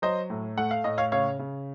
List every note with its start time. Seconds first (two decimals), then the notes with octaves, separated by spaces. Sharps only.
0.02 F#3 C5 D#5
0.30 A2
0.57 A3 F#5
0.71 F5
0.84 A2 D#5
0.98 C#5 F5
1.12 C#3 C#5 F5
1.39 C#3